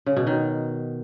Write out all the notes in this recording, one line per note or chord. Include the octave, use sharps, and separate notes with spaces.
C#3
B2
D#3